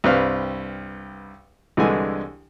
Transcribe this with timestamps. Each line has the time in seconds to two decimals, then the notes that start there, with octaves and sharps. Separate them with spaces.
0.04 C2 G2 C4 B4 F5 F6
1.77 C2 D3 E3 G#3 G#5